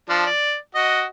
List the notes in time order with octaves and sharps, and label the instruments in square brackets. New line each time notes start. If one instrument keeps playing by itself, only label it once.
[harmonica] F3 D4
D5
F#4 D#5